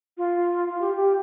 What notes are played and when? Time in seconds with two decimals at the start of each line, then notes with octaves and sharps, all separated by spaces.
0.18 F4
0.69 F4
0.80 G4
0.96 G4